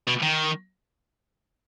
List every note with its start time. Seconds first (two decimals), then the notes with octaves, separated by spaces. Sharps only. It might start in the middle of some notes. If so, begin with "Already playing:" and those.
0.08 B2
0.23 D#3